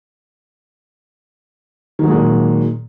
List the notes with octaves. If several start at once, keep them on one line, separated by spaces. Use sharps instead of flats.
A#2 D#3 F#3 G#3